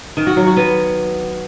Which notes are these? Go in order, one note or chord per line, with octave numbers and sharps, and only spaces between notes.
D#3
F#4
F#3
F#4
B3